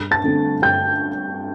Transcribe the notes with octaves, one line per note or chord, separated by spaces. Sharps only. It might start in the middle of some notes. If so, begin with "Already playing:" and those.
Already playing: G2
A5 A6
D3 A3 C4
G2 G5 G6